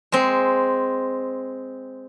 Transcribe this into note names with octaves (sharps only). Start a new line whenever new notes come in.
G#3 C4